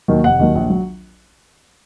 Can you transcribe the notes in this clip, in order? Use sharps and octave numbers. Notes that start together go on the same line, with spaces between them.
D#2 D#3 F#3
F1 F#5
D#2 D#3 F#3
A#1
F#3